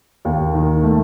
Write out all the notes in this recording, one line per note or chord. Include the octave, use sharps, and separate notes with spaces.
D#2
D#3
A3